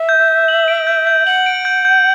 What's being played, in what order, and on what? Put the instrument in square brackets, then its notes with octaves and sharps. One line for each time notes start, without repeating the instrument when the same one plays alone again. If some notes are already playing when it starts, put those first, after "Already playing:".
Already playing: [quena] E5
[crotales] G6
G6
F#7
D7
G6
G6
[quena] F#5 [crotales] F#7
[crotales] D7
G6
G6